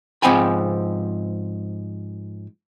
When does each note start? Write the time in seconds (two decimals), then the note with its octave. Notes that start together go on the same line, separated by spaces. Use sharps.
0.22 G#2 F3 C4 G5 G#5 B5